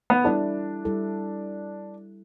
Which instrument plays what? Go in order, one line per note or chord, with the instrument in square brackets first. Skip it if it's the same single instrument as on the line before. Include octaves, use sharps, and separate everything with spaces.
[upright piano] B3
[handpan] G3 E4 A4 [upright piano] D4
[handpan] G3 E4 A4